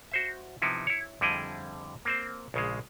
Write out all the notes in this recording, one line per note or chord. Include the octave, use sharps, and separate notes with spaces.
F#4 C5 E5
C3 F3 B3 D#4 E4
E4 C#5
F2 D3 G3 E4 G#4 D#5
A#3 C4 C5
A#1 C#3 G#3